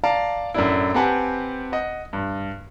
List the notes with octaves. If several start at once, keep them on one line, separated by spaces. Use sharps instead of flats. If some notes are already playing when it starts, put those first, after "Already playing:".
D5 F5 A5 A#5
F#2 A2 D4 E4
C4 G4 B4 F#5 G#5 A5
D#5 F#5
G2